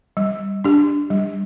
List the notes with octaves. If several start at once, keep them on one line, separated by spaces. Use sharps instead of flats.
G3
D4 G4
G3